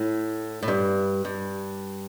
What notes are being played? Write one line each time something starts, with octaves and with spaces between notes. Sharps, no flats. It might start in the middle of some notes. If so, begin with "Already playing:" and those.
Already playing: A2
A2
G2
G2